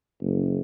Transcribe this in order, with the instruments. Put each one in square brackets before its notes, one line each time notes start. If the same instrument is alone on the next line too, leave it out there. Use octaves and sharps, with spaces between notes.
[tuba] F#1